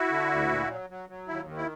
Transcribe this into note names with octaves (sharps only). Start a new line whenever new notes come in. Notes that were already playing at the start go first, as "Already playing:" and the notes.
Already playing: E4 F#4
D3
D2
A#2
F#3
F#3
F#3
D#2 E4
D#3
E4